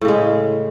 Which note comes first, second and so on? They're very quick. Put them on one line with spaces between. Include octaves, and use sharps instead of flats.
A2 C#3 G#3